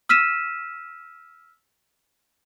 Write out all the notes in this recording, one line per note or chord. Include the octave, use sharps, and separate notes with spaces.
E6 F6 B6 D#7 E7